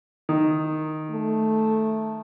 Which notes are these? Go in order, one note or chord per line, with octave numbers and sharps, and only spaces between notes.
D#3
A3